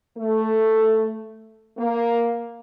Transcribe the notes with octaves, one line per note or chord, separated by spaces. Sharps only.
A3
A#3